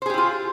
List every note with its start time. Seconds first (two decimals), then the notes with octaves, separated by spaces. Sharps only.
0.02 C5
0.06 G#4
0.10 G4
0.14 E4
0.18 F4